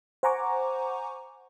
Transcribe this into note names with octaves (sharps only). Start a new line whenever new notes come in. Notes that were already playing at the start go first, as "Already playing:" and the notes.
C5 F#5 G#5 A#5 C#6 D6